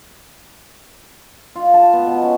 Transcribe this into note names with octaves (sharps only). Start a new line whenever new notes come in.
F4
A5
B3
B2
C#4